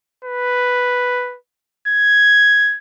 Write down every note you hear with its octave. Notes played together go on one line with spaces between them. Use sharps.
B4
G#6